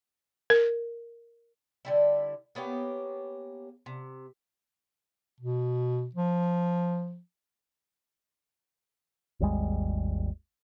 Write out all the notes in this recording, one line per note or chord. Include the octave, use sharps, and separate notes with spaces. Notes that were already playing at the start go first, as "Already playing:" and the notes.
A#4
D3 G3 E4
A#3 B3 C#4 G4
C3
B2
F3
G#1 D#2 G3 G#3